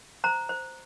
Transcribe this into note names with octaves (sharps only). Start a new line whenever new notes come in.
C5 A#5
C5